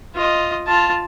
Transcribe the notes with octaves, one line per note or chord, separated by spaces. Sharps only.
F4 D#5
F4 A5